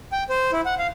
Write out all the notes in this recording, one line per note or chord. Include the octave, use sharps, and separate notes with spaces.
G5
C5
E4
F#5
F5